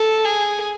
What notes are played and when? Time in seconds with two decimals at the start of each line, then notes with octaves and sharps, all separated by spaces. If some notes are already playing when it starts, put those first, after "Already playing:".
Already playing: A4
0.25 G#4